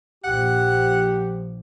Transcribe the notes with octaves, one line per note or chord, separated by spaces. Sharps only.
A#1 F3 G4 F#5